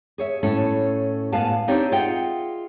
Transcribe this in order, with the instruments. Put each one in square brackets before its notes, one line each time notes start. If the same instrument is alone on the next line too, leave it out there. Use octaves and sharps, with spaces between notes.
[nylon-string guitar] G#4 C#5 E5
A2 C#4 E4 A4 C#5 A5
A2 B3 B4 F5 G#5 A5
C4 D4 D#4 G4 C5 C#5
F4 G#4 D#5 E5 F#5 G5